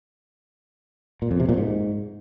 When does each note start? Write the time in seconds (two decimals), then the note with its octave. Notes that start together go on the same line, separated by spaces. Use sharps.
1.22 A#2
1.31 F2
1.40 C3
1.49 A#2
1.58 G#2